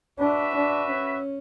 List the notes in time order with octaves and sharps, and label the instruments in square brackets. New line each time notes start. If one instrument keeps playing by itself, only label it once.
[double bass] D4 [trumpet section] F#4 B4 E5
[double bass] D4
C#4